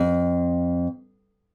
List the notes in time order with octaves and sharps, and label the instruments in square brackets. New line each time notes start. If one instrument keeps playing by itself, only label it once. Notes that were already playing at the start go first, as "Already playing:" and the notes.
Already playing: [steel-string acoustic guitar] F2